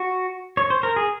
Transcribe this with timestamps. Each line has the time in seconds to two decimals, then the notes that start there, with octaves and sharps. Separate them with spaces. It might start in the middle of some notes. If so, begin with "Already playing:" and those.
Already playing: F#4
0.57 C#5
0.70 C5
0.83 A#4
0.96 G#4